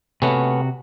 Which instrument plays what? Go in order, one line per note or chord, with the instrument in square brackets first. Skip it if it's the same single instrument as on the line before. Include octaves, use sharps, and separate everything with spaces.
[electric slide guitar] C3 F#4 [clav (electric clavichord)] A3 B3 C#4